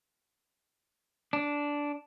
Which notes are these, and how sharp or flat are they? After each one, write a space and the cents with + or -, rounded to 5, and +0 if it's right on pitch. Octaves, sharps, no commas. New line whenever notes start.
D4 -10